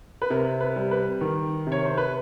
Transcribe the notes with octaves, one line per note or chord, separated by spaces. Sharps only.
B4
C3 A#4
B4
G3
B4
D#3 A#4
C3
C#5
C5
B4